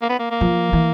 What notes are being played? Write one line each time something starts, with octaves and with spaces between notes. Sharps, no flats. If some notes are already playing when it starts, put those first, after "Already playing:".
A#3
B3
A#3
A#3
F3
E3